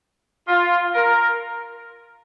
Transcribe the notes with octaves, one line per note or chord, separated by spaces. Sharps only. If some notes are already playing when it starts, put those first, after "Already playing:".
F4
A#4